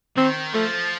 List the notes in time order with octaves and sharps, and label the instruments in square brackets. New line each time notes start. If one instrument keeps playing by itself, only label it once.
[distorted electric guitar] D#3 [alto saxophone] C4
[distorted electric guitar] F3 [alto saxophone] A3